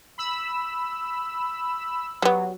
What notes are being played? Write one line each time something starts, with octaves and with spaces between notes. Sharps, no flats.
B5 E6
F#3 G3 B3